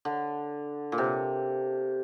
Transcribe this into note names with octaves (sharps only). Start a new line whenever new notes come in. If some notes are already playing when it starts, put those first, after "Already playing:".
D3
A#2
C3